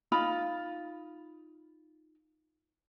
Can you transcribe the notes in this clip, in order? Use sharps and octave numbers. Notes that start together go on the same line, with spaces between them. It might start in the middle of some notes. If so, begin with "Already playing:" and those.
D#4 F4 B5